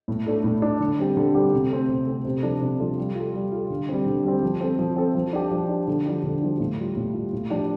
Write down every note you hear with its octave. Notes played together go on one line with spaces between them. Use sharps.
A2
A3 D4 A4
A2
A3 D4 A4
D3
G3 C4 G4
D3
G3 C4 G4
C3
A3 C4
C3
A3 C4
C3
F3 D4 F4 A4
C3
F3 D4 F4 A4
G3
F4 A4
G3
F4 A4
D3
G3 C4
D3
G3 C4
F3
C4 A4
F3
C4 A4
F3
D4 G4
F3
D4 G4
D3
F3 D4 G4
D3
F3 D4 G4
A2
G3 F4
A2
G3 F4
A2
F3 D4 G4